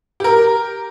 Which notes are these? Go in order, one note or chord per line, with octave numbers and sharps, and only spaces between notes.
G4 A#4